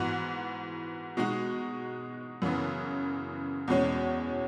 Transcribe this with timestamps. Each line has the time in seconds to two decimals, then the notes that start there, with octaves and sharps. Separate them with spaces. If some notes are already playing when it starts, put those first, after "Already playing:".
Already playing: G#2 E3 B3 F#4
1.17 B2 G#3 D#4 F#4
2.42 F#2 C#3 E3 B3
3.68 E2 B2 G#3 C#4